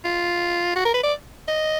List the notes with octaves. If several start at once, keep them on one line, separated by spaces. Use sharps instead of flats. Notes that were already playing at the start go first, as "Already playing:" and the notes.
F4
F#4
A#4
B4
D5
D#5